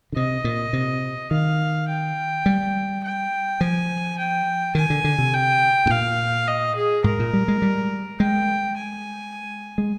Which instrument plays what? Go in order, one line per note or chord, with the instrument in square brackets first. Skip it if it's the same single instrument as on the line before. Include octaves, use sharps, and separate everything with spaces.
[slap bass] D3
[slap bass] C3 [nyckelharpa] D#5
[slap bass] A#2
C3
[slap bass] D#3 [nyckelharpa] F5
[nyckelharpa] G5
[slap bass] G3
[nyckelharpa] G5
[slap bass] F3 [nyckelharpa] G#5
[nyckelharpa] G5
[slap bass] D#3 [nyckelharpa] G#5
[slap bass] D3
D3
C3
[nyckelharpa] G5
[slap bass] G#2
[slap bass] A#2 [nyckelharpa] F5
[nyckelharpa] D#5
G#4
[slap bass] G#2 [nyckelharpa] A#4
[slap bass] A#2
G3
G#3
G3
[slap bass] G#3 [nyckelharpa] G5
[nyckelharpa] G#5
[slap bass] G#3